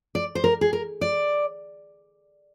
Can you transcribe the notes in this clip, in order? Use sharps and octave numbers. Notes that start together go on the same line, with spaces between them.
D5
C5
A#4
G#4
A#4
D5